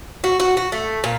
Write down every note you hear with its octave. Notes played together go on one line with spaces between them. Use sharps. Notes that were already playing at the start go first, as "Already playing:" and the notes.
F#4
F#4
F#4
A3
A#2